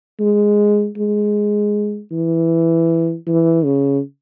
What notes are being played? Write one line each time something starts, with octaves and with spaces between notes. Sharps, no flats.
G#3
G#3
E3
E3
C#3